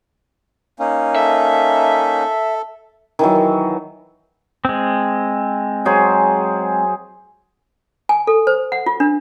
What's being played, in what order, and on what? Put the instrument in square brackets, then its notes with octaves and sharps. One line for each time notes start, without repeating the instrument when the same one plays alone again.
[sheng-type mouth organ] A#3 C#4 D#4
[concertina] A4 [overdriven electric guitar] E5
[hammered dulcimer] D#3 E3 F#3
[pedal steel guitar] G#3 C4
[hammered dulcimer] F#3 G#4 C5
[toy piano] G#5
A4
C5
F#5
F4
D4